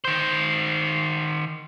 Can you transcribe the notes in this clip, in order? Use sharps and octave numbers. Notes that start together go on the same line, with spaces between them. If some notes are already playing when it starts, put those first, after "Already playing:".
D#3 C5